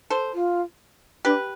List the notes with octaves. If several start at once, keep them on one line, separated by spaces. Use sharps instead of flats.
A4 C5
F4
D4 G4 B4